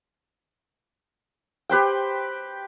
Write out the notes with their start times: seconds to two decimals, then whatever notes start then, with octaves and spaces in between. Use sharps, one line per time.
1.70 G4 B4 C5 G5